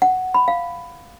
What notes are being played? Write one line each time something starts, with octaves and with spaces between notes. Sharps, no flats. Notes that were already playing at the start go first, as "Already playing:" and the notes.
F#5
B5
F5